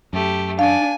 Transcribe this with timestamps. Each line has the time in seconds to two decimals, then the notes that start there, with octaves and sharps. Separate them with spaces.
0.13 F#2 A3 G4
0.59 D4 F5 G#5